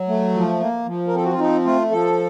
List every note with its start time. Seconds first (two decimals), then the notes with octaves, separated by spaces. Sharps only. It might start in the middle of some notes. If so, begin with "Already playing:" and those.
Already playing: F#3
0.08 A3
0.35 F3
0.61 A#3
0.86 F3
1.08 A#4
1.13 C4 A4
1.24 F#4
1.32 F4
1.39 F3 D#4
1.65 A3 F4
1.91 F3 A4